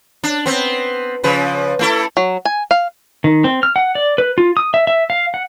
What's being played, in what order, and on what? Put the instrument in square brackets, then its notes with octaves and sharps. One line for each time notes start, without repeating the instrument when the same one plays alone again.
[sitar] D4
B3 C4
C#3 F3 B4
A3 E4 A4
[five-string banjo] F#3
G#5
F5
[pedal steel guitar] D#3
C4
F6
F#5
D5
B4
F4
D#6
E5
E5
F5
F#5